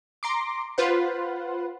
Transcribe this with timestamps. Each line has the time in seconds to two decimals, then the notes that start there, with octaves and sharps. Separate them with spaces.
0.23 A#5 C6 D6
0.78 F4 B4 C5 F#5